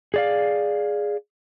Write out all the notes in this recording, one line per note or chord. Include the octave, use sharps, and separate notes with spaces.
G#4 D5 F5